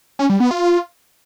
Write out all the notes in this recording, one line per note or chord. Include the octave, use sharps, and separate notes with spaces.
C#4
G3
B3
F4